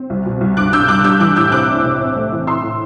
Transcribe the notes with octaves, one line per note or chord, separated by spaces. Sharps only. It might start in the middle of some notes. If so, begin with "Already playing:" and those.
Already playing: C4
C2
B2
C2
G2 D6 F#6
G2 E6 G6
G2 D6 F#6
G3 E6 G6
E3 D6 F#6
A2 E6 G6
C3 D6 F#6
D4
C3
C4
A3
E3
A2 C6 E6
A2